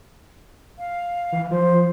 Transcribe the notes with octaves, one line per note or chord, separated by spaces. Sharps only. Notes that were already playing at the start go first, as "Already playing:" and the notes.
F5
E3
F3 C5